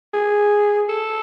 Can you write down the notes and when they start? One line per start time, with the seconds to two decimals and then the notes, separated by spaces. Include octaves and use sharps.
0.14 G#4
0.89 A4